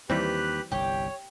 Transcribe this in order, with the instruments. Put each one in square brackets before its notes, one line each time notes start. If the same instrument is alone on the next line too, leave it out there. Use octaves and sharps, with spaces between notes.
[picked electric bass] D#2 [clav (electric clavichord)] E3 G3 C4 [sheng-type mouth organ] G4 B4 F#6
[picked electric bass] G1 C2 [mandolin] G4 [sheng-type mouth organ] C#5